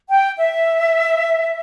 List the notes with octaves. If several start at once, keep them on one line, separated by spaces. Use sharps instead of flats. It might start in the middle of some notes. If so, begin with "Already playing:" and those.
G5
E5